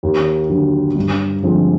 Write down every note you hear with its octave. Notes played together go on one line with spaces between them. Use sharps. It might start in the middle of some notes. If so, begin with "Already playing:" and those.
D#2
D3 F#3
G2
D3 F3 G#3 C4